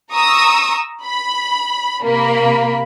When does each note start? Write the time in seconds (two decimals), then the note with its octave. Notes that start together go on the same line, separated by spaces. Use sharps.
0.12 A#5 C#6 D#6 E6
1.04 B5
2.03 C3 A#3 B5